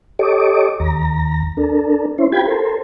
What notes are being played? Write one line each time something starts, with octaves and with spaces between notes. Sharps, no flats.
G4 A4 C#5 D#5 D6
D#2 A#5
D4 A4 A#4
C#4 E4 C5
F4 G4 G5 B5 G#6
A4 A#4 C5